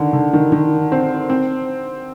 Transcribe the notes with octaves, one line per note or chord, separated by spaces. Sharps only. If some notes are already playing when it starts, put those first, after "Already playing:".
Already playing: D3 D#3
D3
D#3
D#3
C4
C4